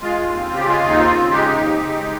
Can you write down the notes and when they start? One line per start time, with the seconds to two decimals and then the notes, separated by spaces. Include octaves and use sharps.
0.02 G#3 F4
0.18 D#2
0.34 C4
0.50 C#3 G4
0.67 G#3 F4
0.83 D#2
0.90 D#4
0.99 C4 F4
1.16 C#3
1.31 G#3 D#4 G4
1.48 D#2
1.63 C4
1.80 C#3
1.96 G#3